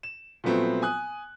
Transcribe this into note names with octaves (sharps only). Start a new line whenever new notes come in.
E7
A#2 F3 F#3 A3 B3 C4
G#5 D#6 F#6